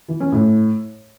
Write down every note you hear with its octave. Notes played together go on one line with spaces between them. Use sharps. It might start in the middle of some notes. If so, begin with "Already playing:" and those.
E3
C#4
A2